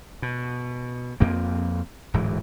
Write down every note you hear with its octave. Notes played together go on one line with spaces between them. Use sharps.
B2
F2 A#3 C4
D1 G#2 E3